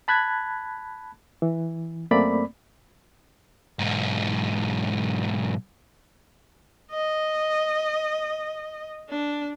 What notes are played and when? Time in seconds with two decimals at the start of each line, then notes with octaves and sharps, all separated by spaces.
0.08 A5 B5 F#6 G#6
1.42 E3
2.11 F#2 A3 A#3 C4 D5 B5
3.79 B1 G#2
6.91 D#5
9.09 D4